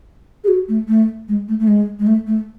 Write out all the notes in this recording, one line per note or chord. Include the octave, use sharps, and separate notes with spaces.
G#4
F#4
A3
A3
G#3
A3
A3
G#3
G#3
A3
A3